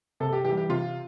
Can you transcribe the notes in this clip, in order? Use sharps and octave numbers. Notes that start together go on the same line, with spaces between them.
C3 A4
G4
E3 G4
G3
G4
C3 F4